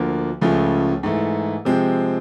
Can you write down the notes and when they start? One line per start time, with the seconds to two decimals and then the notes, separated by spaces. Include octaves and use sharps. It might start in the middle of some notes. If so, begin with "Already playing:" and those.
Already playing: D2 D3 F3 A#3
0.41 C#2 C#3 F3 A3 C#4
1.03 G#2 E3 A3
1.65 C3 F3 G#3 C4